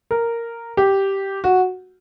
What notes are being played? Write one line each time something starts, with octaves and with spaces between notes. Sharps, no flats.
A#4
G4
F#4